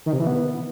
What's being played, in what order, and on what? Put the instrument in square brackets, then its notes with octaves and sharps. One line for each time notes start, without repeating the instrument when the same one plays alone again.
[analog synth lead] D#3
C3
E3
B3